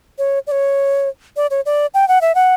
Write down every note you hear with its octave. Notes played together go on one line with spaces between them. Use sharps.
C#5
D5
C#5
D5
C#5
D5
G5
F#5
E5
F#5